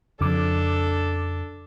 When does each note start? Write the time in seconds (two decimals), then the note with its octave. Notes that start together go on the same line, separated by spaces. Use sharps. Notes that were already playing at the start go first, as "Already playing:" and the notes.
0.21 F2 C#3 F3 D4 A4 D6